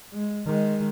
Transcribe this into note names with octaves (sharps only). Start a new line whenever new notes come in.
G#3
D#3 G#3